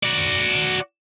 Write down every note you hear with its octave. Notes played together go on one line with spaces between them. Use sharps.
F#4 D5